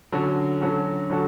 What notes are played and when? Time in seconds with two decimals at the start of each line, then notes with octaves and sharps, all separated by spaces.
0.12 D3 F#3 C#4 F#4 A4
0.61 D3 F#3 C#4 F#4 A4
1.10 D3 F#3 C#4 F#4 A4